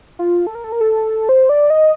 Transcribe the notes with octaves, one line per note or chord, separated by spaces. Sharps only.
F4
A4
A#4
A4
A#4
A4
C5
D5
D#5